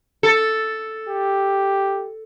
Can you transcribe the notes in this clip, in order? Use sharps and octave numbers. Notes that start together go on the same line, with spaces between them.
A4
G4